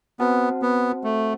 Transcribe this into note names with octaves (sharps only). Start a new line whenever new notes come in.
B3 C4 F#4 C5 F#5 A5
B3
A3